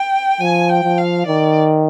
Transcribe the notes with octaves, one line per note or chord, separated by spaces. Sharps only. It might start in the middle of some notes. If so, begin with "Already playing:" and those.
Already playing: G5
F3 G#5
G5
F3
F5
D#3 D5